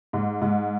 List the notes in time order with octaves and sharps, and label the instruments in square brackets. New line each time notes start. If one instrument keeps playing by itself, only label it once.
[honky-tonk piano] G#2
G#2